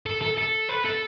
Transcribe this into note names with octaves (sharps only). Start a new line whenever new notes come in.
A4
A4
A4
B4
A4